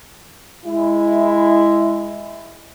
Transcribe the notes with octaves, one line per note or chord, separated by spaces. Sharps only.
G#3 E4